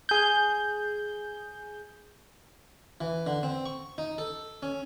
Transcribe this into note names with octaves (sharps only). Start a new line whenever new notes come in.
G#4 G6
E3
D3
C4
C#6
D#4
A4
C#4